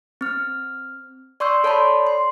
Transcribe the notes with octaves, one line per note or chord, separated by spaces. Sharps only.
C4 F6
D5 C6 C#6 E6 G6
A4 C#5 D5 A5 B5 C6
C6